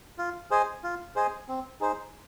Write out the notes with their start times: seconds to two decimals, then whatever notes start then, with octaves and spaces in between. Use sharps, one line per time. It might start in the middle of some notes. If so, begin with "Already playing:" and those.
0.18 F4
0.51 G#4 C5 D#5 G#5
0.83 F4
1.16 G#4 C5 D#5 G#5
1.48 C4
1.81 D#4 G#4 C5